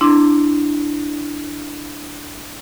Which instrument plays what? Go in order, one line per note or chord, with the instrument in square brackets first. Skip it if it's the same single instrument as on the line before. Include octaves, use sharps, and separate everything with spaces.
[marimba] D4 E4 C6 D6